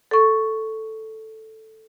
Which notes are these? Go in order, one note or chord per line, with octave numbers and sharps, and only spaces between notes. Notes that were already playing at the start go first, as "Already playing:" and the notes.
A4 C#6